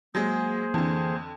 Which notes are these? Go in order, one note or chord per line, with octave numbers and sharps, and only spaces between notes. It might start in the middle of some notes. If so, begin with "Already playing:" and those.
F#3 G#3 A#3 G#4 C5
F2 D3 E3